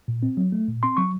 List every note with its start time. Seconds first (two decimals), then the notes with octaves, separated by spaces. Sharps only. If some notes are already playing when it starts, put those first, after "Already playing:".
0.08 A#2
0.23 C4
0.37 F#3
0.52 A3
0.68 A#2
0.83 C4 C6
0.97 F#3 C#6